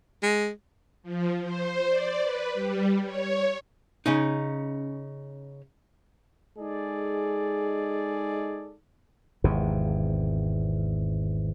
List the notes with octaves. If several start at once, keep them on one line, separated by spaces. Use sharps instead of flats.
G#3
F3
C5
D5
B4
G3
C#5
C#3 C#4 D#4
G#3 D#4 G#4 A4 D5
G#1 E2 C3